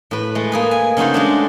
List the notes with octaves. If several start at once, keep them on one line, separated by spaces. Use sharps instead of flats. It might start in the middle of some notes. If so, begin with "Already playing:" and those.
A2 B4
G#3 A3
A#3 G#4 B4
G#5
C#3 A3 D#4 F#4 C5
G#3 A3 D4